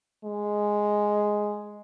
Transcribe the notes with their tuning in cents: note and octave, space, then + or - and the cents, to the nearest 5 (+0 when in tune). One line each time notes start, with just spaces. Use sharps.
G#3 +0